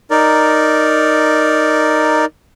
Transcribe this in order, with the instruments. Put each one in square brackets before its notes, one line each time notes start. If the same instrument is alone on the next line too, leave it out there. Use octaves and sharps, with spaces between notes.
[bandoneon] D#4 A#4 D5